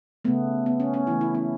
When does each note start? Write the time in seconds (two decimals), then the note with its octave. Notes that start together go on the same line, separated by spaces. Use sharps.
0.25 C#3 A3 B3
0.66 B3
0.80 C#4
0.94 C#4
1.07 C#3 E3 A3 E4
1.21 E4
1.35 C#4